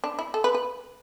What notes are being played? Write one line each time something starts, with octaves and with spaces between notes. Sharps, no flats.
D4
E4
A4
B4
B4